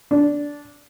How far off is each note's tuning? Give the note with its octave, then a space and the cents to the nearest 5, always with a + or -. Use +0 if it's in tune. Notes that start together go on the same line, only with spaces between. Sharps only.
D4 -10